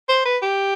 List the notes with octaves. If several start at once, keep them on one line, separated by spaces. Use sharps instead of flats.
C5
B4
G4